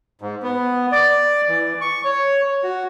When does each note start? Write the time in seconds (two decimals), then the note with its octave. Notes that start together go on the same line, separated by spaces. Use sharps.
0.21 G#2
0.43 B3
0.92 D5
1.48 E3
1.81 C#6
2.05 C#5
2.63 F#4